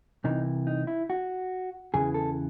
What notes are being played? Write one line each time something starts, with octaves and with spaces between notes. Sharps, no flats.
C2 C3 E3 D#4
D#4
E4
F#4
E2 C#3 E3 G#4
A4